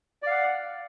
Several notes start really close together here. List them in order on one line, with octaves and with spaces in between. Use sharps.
D5 F5 F#5